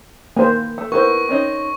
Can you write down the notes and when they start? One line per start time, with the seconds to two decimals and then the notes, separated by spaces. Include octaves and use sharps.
0.37 E3 A#3 A#4 C5 G#5
0.78 A3
0.92 B3 E4 A#4 C5 C#6
1.29 C4 C#4 D#4